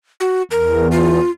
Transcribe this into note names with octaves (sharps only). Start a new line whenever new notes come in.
F#4
E2 A#4
F4